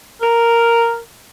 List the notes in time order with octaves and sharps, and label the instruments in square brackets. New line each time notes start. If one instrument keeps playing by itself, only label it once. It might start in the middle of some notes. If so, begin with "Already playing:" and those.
[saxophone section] A#4